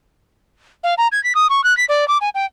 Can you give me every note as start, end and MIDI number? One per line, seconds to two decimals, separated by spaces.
0.84 0.94 77
0.98 1.08 82
1.12 1.22 92
1.24 1.33 95
1.35 1.47 87
1.50 1.64 85
1.64 1.76 90
1.77 1.85 95
1.89 2.07 74
2.08 2.18 86
2.21 2.29 80
2.35 2.46 79